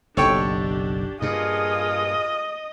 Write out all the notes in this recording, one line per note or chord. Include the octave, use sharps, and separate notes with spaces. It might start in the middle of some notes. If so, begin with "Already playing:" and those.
F#1 B1 D4 G4 A4 C#5 G5
G2 A#2 F4 G#4 D#5 D#6